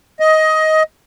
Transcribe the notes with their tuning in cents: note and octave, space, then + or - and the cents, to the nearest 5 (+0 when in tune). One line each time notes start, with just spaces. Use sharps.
D#5 +15